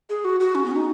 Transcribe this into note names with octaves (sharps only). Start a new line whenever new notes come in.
G#4
F#4
F#4
C#4
B3
C#4
D#4